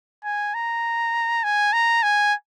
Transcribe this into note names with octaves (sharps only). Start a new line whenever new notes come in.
G#5
A#5
G#5
A#5
G#5